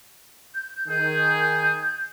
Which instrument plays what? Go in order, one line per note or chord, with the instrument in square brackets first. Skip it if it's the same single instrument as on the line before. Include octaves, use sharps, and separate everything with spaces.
[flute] G6
[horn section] D#3 G#4 [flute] G6